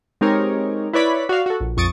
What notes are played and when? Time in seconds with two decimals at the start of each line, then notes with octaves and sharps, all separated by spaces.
0.21 G#3 C4 D#4 G4 A#4 C#5
0.93 E4 B4 C#5 D5 B5
1.29 F#4 D5 F5
1.46 F#4 A4
1.60 A#1
1.77 A#1 F2 C#6 D#6 A6 D7